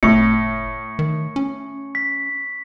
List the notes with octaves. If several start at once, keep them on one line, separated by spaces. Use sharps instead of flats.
F#1 A2 C#6 C#7
D#3
C#4
B6